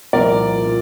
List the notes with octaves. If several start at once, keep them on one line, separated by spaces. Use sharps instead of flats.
C2 A#2 F3 A#4 D5
A#2